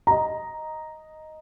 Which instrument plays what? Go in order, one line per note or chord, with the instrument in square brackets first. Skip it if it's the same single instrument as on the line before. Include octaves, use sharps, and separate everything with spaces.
[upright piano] D#5 A#5